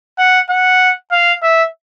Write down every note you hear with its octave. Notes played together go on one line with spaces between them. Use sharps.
F#5
F#5
F5
E5